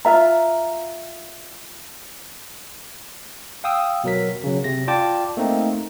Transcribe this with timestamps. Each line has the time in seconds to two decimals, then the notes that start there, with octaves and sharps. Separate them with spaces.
0.05 F4 E5 A#5
3.64 F5 G5 D#6 E6
4.04 B2 F#3 A#4 B6
4.44 C#3 F#3
4.64 C3 A#6
4.87 F4 D5 G5 A5 D6
5.37 A3 A#3 C4 D#4